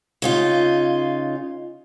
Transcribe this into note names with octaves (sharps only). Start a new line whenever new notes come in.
C#3 D#4 F4